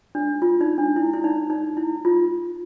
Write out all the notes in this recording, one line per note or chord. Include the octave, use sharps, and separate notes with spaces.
D4
F4
D#4
D4
E4
E4
D#4
D#4
E4
F4